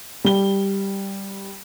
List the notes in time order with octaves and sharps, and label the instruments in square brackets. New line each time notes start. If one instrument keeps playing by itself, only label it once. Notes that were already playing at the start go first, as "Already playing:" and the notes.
[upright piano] G3 G7